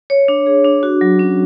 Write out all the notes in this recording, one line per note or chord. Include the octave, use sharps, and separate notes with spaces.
C#5
D4
G#4
D4
F#4
F#3
C#4